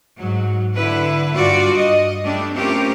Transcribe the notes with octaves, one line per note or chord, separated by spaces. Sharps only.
G#2 F#3
D3 E4 B4
G2 F4 F#4 D5
D#5
G3 A3 D4
A3 C4 C#4 F4 G4 A#4